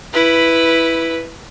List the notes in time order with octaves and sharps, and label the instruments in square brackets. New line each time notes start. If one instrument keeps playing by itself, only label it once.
[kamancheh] E4 B4